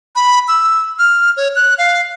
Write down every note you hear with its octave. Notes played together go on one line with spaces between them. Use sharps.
B5
E6
F6
C#5
F#6
F5